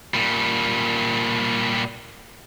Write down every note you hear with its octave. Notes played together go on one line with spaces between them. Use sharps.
A#2 G3